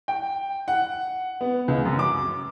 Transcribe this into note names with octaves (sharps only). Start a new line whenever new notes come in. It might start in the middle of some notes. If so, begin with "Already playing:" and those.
G5
F#5
B3
C#2
F#2
D6